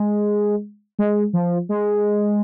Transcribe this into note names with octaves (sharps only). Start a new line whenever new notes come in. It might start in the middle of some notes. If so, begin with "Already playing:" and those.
Already playing: G#3
G#3
F3
G#3